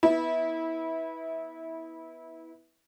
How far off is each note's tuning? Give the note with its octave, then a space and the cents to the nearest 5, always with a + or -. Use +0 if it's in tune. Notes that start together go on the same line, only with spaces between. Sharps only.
B3 +0 E4 -20